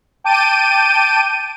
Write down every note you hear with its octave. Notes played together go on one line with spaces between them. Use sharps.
G5 A5 D6 G6 D7 D#7